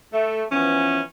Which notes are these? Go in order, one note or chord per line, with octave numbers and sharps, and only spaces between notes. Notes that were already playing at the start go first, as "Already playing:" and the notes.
A3
E3 F3 B3 C#4